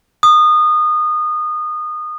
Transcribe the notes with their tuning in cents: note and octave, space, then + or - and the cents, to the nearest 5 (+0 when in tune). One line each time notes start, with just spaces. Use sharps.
D#6 -25